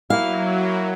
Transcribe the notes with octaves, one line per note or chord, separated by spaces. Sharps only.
F#3 A#3 E4 F5